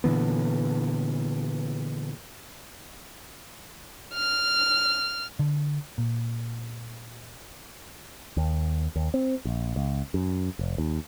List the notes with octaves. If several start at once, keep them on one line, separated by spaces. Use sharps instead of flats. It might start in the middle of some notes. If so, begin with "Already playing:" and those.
A#2 D3 E3 B3
F6
D3
A#2
D#2
D#2
C4
A#1
C#2
F#2
F1
D#2